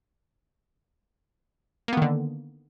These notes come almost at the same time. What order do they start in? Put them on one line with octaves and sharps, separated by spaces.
A#3 B3 D#3 D3